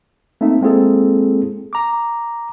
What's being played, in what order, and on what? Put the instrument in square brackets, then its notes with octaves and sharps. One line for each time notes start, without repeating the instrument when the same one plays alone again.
[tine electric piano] A3 A#3 C4 D#4 E5
G#3 A#3 C4 E4 G#4 A4
A#5 D6